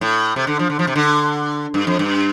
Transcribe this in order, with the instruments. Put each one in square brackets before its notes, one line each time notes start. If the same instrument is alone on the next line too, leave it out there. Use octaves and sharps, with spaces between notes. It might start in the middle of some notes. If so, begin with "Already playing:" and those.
[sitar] A2
C3
D3
F3
D3
F3
C3
D3
G2
F2
G2